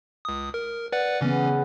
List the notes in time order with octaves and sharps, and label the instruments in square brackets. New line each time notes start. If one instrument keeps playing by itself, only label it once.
[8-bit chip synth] C#2 D#6
A#4
B4 D5 F#5
[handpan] C#3 B3 [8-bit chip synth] E3 C#4